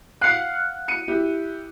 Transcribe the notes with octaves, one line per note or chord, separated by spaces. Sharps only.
F5 F#5 F#6
C#7 D#7
E4 G4